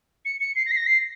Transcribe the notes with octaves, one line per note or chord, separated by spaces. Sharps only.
C#7
C#7
C7
A#6
C7
A#6
C7